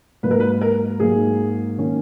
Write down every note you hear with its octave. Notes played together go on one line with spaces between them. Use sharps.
G#2 F#3 A#3 D#4 B4
A#4
B4
A#4
G#2 F#3 A#3 D#4 G#4
D#3 A#3 C#4